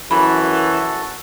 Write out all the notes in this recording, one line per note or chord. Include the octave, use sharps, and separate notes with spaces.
F#2 E3 F#4 A4 B5